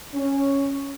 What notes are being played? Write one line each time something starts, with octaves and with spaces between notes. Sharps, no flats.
C#4